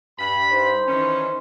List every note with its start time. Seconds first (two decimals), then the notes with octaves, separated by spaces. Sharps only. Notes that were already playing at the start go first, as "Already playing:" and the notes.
0.18 G2 B5
0.51 D#4 C5
0.88 D#3 E3 C#4